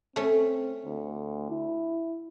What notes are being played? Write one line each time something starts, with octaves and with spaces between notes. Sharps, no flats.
A3 C4 C#4
D2
E4